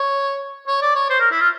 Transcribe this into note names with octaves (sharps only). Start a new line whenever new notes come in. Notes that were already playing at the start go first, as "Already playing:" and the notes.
Already playing: C#5
C#5
D5
C#5
C5
A#4
E4
F4